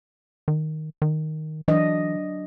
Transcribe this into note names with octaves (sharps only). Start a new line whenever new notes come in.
D#3
D#3
E3 F#3 D4 D#5